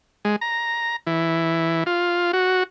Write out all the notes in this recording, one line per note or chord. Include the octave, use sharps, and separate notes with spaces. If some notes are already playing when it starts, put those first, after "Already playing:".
G#3
A#5
E3
F4
F#4